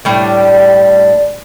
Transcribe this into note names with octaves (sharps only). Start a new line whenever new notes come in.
A2 G3 D4